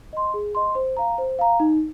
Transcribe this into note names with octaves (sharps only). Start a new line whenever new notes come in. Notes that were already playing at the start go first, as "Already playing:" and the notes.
D#5 C6
G#4
D#5 C6
C5
F5 A#5
C5
F5 A#5
D#4